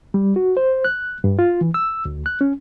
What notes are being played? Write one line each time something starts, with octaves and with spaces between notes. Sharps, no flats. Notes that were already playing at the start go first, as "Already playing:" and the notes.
G3
F#4
C5
F#6
G2
F4
E3
E6
D2
F#6
C#4